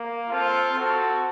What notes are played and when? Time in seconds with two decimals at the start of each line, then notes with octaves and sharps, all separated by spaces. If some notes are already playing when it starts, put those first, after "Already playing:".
Already playing: A#3
0.29 C4 F4 A4
0.74 C4 F#4 A4